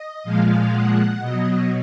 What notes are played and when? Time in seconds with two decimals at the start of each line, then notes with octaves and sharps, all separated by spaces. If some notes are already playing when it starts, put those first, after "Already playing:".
Already playing: D#5
0.24 A#2 F3 G#3 F5
0.72 F#5
1.19 B2 F#3 D#5